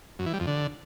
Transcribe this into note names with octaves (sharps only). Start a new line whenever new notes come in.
F#2
E3
G3
F2
D3